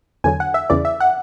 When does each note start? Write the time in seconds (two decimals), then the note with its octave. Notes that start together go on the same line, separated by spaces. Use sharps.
0.24 E2 D3 F#3 G#5
0.40 F#5
0.54 E5
0.70 E2 C#3 E3 D5
0.85 E5
1.00 F#5